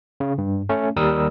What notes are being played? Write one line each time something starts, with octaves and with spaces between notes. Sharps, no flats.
C#3
G2
A3 C#4
D#2 G3 A#4 D#6 E6